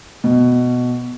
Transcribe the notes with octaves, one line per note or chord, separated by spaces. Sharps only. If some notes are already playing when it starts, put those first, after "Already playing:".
B2